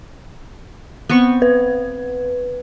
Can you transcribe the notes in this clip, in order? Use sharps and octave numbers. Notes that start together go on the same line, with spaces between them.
B3 C4 C#6
B4